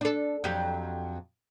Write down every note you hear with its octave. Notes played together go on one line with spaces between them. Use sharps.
D4 A4
F2 F#3 G4